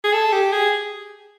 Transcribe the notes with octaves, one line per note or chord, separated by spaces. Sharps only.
G#4
A4
G4
G#4